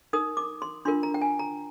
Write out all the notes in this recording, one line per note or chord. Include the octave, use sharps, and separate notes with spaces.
D#4 A#4 D#6
D6
C6
D4 F4 A#4 C6
A#5
G5
G#5
A#5